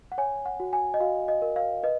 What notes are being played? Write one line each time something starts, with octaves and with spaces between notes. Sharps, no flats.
F#5
C#5 G#5
F#5
F#4
G#5
D#5
F#4 F5
D#5
A#4
F5
B4 D#5